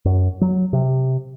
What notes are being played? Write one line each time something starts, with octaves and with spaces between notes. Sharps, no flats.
F#2
F#3
C3